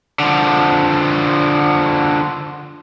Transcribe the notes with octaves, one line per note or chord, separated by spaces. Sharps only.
D3 F3